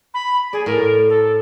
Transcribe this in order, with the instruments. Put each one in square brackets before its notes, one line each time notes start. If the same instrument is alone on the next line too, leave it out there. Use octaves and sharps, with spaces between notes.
[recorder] B5
[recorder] G#4 [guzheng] D5
[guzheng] A2 [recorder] A#4
[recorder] A4